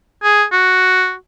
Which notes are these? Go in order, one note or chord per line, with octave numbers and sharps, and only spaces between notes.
G#4
F#4